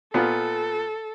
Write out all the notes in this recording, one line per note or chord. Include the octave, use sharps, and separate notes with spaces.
A#2 B3 F4 A4